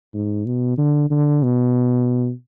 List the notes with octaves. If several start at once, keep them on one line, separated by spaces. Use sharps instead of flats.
G#2
B2
D3
D3
B2